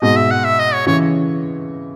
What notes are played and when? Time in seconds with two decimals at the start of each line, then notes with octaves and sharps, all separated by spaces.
0.02 G#2 B2 D#5
0.16 E5
0.31 F#5
0.45 E5
0.59 D#5
0.73 C#5
0.87 C#3 E3 C#5